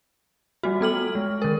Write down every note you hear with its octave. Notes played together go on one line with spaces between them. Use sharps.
G3 A3 F#4
B3 A4 F6 F#7
G#3
D#3 A#4